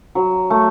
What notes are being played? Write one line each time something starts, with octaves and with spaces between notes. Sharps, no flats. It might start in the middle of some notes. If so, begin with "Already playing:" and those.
F#3
A3